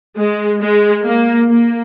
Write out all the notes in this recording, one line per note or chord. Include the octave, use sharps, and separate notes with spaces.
G#3
G#3
A#3
A#3